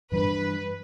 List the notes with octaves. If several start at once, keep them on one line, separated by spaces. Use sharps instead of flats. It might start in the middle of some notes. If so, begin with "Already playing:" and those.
G2 E3 G3 D4 B4